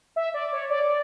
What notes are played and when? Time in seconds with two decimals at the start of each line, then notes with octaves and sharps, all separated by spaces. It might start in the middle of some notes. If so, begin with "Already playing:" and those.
0.16 E5
0.34 D5
0.52 C#5
0.70 D5
0.88 D5